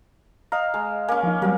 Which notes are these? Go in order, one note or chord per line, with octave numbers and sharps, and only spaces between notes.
D#5 F5 A#5
G#3
A#3 C#4 G#5
F3 D#4
F#3 G3 A#3 C4